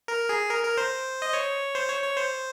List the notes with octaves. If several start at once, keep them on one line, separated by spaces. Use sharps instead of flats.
A#4
G#4
A#4
A#4
C5
D#5
C#5
C5
C#5
C#5
C5